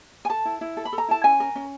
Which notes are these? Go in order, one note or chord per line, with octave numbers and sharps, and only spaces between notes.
G#5
A4 A5
E4
E4
A4
B5
A4
A#5
E4 A5
C#4 G#5
A#4
C#4